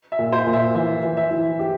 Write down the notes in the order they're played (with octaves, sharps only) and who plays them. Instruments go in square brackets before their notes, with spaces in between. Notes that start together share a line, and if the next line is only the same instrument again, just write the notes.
[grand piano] E5
[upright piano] A#2
[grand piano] C5
[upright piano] A#2
[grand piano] E5
[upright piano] E3 [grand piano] E5
[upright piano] E3
[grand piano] E5
[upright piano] E3
G4